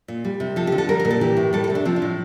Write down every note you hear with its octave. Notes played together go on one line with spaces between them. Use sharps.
A#2
G3
C3
F3 A4
G4
D3
A4
G3 A#4
A#4
A#2
A4
E3 G4
A2
G3 A4
A4
C3
D4
F3 C4
D4
A2